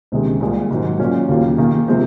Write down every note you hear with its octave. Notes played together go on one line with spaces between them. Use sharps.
C#2 C3 D#3 G#3
C2 A#2 G#3
G#2 D#3 F#3
A#2 F#3 C#4
D#2 C#3 F#3 A#3 F4
D#3 A#3 F4 G#4
C3 F3 G#3 C4